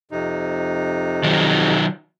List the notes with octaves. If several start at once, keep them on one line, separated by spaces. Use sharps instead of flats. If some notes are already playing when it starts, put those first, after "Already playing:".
F2 C3 D#4
D#3 F#3